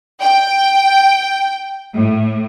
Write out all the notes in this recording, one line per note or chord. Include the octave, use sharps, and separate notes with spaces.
G5
A2